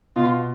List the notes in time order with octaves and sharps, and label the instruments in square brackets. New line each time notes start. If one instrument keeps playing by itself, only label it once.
[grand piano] B2 [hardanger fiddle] F4